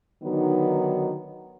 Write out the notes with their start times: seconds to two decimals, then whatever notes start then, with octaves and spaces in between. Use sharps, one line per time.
0.23 D3 D#3 F#3 B3 D#4 F#4